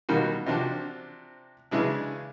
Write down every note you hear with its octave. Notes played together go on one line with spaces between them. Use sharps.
B2 D#3 G3 A#3 F#4
C3 F3 D4 F#4
C#3 E3 G#3 D4 E4